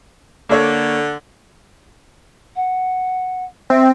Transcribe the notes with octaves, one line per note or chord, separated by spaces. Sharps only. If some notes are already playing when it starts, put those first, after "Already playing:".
D3 A#3 A4 C#5
F#5
C4 E5